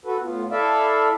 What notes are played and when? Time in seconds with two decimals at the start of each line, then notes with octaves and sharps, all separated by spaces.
0.06 F#4 A4 B4
0.23 A2 B3 F4
0.51 E4 A4 D5 E5 F5